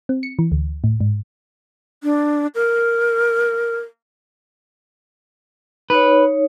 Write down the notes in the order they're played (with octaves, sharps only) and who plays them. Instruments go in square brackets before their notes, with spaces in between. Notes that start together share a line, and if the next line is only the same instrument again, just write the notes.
[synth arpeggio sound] C4
C#7
E3
D2
A2
G#2
[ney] D4
A#4
[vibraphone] D#4 C#5 [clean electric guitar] B4